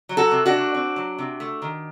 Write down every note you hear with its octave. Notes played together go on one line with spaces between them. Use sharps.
F#3
F#4 A4
C3
D4 F#4
A3
C4
F#3
C3
A3
D#3